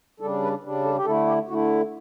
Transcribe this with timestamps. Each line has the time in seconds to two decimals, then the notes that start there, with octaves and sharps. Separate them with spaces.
0.20 C#3 G3 D4 A4
0.42 B4
0.63 C#3 G3 D4
0.84 A4
0.96 G4
1.05 D3 A3 E4 A4
1.27 G4
1.48 D3 A3 E4 F#4